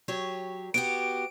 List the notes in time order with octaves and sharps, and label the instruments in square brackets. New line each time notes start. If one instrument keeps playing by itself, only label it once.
[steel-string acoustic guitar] F#3 G4 C#5
[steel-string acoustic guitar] B3 F#4 G4 [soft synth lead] D7